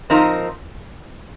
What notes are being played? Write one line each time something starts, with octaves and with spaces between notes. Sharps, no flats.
F3 C4 D#4 A#4